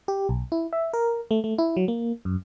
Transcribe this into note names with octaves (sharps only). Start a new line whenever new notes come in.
G4
B1
E4
E5
A#4
A3
A3
E4
F#3
A#3
F#2